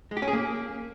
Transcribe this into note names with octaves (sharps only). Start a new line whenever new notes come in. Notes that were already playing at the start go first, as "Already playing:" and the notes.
G#3
G4
C#4
G#4
A#3